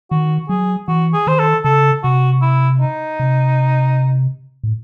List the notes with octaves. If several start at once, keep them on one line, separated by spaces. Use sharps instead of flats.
D#3 F#4
F#3 G#4
E3 F#4
G#4
D#3 C5
A4
C#3 A4
C3 F#4
E4
D#4
C3
A2